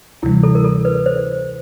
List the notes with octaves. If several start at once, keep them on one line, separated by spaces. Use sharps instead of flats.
D2 C3 E3 G3 E4
A4
A#4
A4
B4
C5